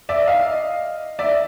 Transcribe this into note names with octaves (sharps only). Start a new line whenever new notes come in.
D5 E5
D#5 F5
D5 E5